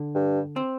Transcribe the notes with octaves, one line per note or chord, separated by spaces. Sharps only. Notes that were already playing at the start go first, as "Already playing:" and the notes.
Already playing: D3
G2
C4